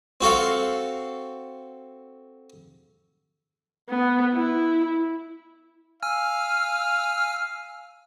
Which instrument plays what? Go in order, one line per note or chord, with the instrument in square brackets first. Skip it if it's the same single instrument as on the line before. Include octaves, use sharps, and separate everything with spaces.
[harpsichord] C4 F#4 A4 F5
[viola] B3
E4
[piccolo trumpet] F5 [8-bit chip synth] G#5 E6 F6